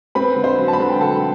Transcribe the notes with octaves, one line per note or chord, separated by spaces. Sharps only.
C4 B4 B5
D3
C5 C6
F#3
A5
B4 B5
D3
G5
F#3 A4 A5